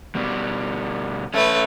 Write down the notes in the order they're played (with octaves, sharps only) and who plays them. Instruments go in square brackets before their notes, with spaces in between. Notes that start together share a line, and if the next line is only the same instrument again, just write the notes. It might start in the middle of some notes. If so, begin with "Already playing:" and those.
[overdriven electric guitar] B2 G3
[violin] A3 B4 [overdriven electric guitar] C#4 A4